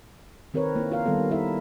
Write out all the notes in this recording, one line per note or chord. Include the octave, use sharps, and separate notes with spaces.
D#3 C4 A#4 B4 C#5
A#3 E4
F4 A#4 F5
D#3 G3 B3 A4
E4 A#4 E5